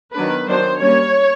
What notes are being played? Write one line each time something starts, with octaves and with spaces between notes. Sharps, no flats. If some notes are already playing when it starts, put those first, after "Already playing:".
D#3 F#3 B3 D4 B4
D#3 F#3 B3 D4 C5
G3 A#3 C#4 C#5